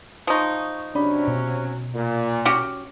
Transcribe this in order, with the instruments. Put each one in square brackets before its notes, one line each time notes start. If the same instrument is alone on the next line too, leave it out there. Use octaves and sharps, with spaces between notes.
[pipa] F3 D#4 [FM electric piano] C#6 D#6
[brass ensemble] C3 F#3 C#4 [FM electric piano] D4 D5 B5
[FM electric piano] B2
[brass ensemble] A#2
[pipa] C#4 F#4 G4